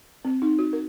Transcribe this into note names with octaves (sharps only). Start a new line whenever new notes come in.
C4
D#4
F#4
A#4